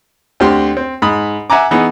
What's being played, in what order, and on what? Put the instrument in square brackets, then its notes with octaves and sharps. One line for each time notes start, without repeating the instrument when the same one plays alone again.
[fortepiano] D2 C4 G4 C6
C4
G#2 B5 D#6
E5 F#5 G#5 A#5 D6
E3 B3 D#4 G#4